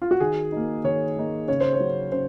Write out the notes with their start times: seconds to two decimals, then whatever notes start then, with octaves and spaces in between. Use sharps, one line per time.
0.02 F4
0.11 F#4
0.20 D#3 G#4
0.52 A#3 D#4
0.84 D#3 C#5
1.16 A#3 D#4
1.48 C#3 C#5
1.61 C5
1.73 C#5
1.80 F#3 C#4
2.12 C#3 C5